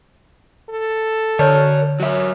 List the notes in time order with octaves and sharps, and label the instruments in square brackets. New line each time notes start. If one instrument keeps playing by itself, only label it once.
[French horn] A4
[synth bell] D3 [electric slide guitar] A#4 C#5
[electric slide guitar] F#3 E5 [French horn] C#5